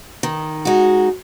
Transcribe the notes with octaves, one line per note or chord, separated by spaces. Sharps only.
D#3
G#3 D#4 F#4